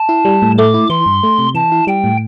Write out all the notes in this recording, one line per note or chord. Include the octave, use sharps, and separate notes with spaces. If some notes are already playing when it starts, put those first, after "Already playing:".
Already playing: A5
E4
G3
A2
A3 D6
E4
E3 C6
G2
A3
C3
E3 A5
E4
G3 G5
A2